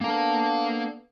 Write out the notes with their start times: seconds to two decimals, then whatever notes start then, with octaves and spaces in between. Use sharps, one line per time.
0.01 A#3 B3 D4 A4 F5